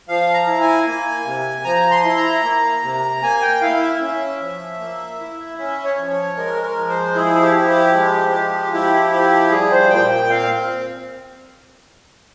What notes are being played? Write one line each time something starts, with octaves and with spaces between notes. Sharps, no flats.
F3 F5
A#5
E4
G#5
A#3
C3
F3 A#5
C6
E4
A#5
A#3
C3
A#3 G#5
G5
E4 F5
E5
C#4
F3
A#3
E4
C#4 E5
C#5
F3
C#5
G#3 A#4
A#4
F3
C5
E4 G#4
G4
F3
G4
G#3
F3
E4 G4
F3 G4
G3 G#4
C5
A#2 G5
G5
C4 F5